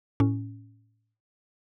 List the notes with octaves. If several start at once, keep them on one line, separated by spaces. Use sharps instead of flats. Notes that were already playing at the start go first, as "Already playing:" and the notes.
A2 C#4